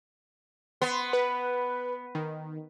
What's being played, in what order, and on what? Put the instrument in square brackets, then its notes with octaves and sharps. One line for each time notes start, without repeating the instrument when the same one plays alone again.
[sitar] B3 [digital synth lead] C6
[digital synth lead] B4
D#3